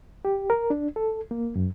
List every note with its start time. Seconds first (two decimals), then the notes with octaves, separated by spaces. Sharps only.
0.25 G4
0.50 A#4
0.70 D4
0.96 A4
1.31 A#3
1.56 F#2